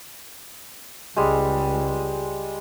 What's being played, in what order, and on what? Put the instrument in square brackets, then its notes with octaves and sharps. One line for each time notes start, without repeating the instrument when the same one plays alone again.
[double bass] C#2 [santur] G3 G#3